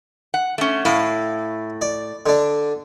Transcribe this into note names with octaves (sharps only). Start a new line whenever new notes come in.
F#5
A3 C#4
A2 E4 F5
D5
D3 D4